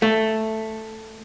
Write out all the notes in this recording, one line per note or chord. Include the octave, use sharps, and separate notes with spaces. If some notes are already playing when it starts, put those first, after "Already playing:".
A3